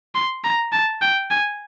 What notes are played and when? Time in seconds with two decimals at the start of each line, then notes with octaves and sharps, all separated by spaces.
0.15 C6
0.44 A#5
0.73 A5
1.01 G5
1.30 G#5